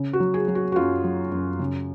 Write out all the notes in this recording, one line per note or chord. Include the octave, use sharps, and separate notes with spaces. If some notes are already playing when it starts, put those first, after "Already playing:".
Already playing: C#3
F#4
F#3
G#4
F#3
F#4
F#4
F#2 F4
F#3
F#2
C#3